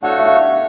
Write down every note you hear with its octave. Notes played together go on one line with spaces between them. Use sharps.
A3 D4 F#4 A4 C#5 F#5
F5
E5
F5